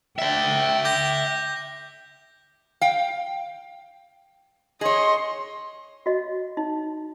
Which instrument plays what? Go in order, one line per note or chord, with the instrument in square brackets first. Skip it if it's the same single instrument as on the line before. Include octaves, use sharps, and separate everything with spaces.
[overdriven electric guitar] D5 E5 [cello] G5
[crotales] D6 G6 A#6
[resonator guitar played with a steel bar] F5 G5
[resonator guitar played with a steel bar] G#4 C#5 [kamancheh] D#5 C6
[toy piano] F#4 D#5
D#4